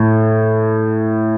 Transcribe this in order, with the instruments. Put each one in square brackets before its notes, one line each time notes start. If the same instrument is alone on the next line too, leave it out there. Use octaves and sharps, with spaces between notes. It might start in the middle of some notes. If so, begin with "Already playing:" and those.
Already playing: [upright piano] A2